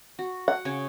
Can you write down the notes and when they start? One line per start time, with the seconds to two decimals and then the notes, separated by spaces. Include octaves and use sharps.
0.19 F#4
0.48 F#5
0.65 C#3 C#5 G#5